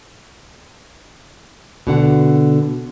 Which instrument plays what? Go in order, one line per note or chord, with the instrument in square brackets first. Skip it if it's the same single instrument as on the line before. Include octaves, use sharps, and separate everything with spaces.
[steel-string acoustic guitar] B2 D3 F#5